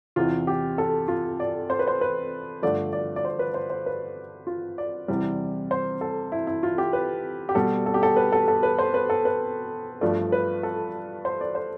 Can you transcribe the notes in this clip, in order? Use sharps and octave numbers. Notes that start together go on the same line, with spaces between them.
E2 C3 E3 F4
G4
A4
F4
D5
C5
B4
C5
B4
G2 D3 F3 A3 D5
D5
D5
C5
B4
C5
C5
B4
F4
D5
E2 C3 E3 G3
C5
A4
E4
E4
F4
G4
B4
G4
B2 G3 A4
A4
G4
A4
B4
A4
A4
B4
C5
B4
A4
B4
G2 F3 A3 D5
B4
A4
C5
D5
C5